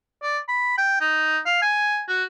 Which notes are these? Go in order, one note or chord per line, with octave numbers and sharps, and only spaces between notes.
D5
B5
G5
D#4
F5
G#5
F#4